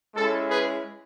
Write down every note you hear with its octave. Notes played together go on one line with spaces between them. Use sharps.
G#3 C#4 E4 A4
G#4 B4